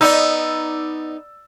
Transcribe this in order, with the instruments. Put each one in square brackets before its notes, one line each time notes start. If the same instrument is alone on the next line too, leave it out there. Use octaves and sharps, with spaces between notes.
[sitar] B3 D#4 [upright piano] D5 E6